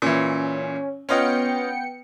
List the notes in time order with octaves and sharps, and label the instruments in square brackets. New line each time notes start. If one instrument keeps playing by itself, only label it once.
[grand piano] A#2 E3 [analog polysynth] C#4
[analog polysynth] B3 G5 C#7 [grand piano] C#4 F4 D#5